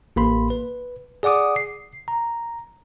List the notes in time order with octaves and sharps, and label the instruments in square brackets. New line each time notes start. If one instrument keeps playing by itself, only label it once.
[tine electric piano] A1 A#3 B5 C6
B4
G#4 D5 F#5 D6 D#6
C7
A#5